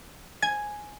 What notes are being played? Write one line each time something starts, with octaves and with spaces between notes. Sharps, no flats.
G#5 G#6